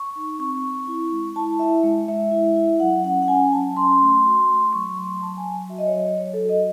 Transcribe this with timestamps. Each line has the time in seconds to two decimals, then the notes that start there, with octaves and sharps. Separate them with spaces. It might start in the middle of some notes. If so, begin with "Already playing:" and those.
Already playing: C#6
0.16 D#4
0.39 C4 C#6
0.63 C4
0.87 E4
1.12 G#3
1.36 E4 A5
1.59 E4 E5
1.84 G#3
2.08 G#3 E5
2.32 E4
2.56 E4
2.80 F#3 F#5
3.04 C#4 F#5
3.22 F#5
3.28 C#4 G#5
3.53 F#3 A5
3.77 C#4 C6
4.00 A3
4.25 F#4
4.49 A3
4.73 F#3 C#6
4.97 F#3 C6
5.21 F#3 A5
5.37 G#5
5.46 F#3
5.69 F#4 E5
5.78 D#5
5.87 C#5
5.94 F#3 D#5
6.17 F#3 C#5
6.33 A4
6.41 F#4
6.49 D#5